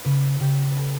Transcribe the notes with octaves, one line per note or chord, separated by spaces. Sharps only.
C#3 B4
C#3 G4
B4
A4